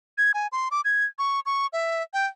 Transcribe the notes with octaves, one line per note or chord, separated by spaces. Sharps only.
G#6
G#5
C6
D6
G#6
C#6
C#6
E5
G5